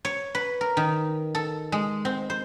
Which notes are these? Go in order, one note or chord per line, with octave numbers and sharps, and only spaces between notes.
C#5
B4
A#4
D#3
A4
G#3
C4
C5